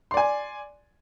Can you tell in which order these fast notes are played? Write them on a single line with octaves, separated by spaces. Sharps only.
C6 D5 G#5